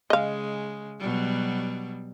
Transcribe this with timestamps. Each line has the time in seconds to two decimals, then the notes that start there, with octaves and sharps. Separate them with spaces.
0.10 C#3 G#3 D#5 F5
0.99 B2 F#3 G3